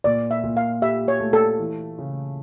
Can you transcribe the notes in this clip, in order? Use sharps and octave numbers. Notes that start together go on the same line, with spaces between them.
A#2 D5
E5
A#2
F5
G4 E5
C#5
A3
A4
E3
C#3